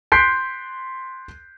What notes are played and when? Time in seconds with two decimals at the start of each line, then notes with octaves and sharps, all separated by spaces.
0.12 C6 F#6 G6 B6 C7 D7